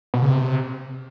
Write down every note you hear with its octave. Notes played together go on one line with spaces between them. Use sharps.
B2
C#3
C3